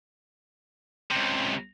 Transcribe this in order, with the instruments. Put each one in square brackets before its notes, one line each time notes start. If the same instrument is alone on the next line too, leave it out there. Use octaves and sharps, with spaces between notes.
[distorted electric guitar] C#2 C3